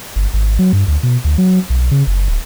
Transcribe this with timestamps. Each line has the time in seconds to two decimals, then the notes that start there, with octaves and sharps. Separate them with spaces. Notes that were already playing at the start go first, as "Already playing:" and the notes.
0.16 G1
0.33 G#1
0.59 F#3
0.73 G2
0.88 D2
1.03 B2
1.24 D2
1.38 F#3
1.70 B1
1.91 C#3
2.07 F#1
2.28 D1